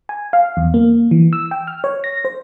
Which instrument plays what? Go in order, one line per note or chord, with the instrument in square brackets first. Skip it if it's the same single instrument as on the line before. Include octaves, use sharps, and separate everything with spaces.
[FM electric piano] G#5
F5
E2
A#3
E3
E6
G5
F6
C#5
A#6
C5